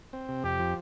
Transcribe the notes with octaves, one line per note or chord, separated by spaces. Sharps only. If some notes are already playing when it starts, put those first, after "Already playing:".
C4
C3
F2 G4
F3